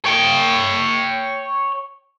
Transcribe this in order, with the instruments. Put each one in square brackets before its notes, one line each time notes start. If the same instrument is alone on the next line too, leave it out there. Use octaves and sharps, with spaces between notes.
[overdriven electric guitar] C#5 G5